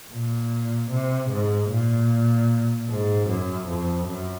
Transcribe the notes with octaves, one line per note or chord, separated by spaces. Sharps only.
A#2
C3
G#2
A#2
G#2
F#2
F2
F#2